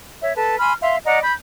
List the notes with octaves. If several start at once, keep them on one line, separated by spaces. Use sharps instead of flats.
C#5 E5
A4 B4 A5
G#5 B5 C6 F6
E5 F5 C6
D5 D#5 F#5 A#5
B5 G6